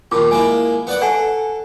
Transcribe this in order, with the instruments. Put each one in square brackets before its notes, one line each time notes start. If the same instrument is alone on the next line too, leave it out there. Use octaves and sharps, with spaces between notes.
[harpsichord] D#2 A#2 [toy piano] F4 A5 D6
[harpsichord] G#3 A#3 E4 [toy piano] G#5
[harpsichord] B3 D5 F#5
[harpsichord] A4 [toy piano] D5 F#5 G#5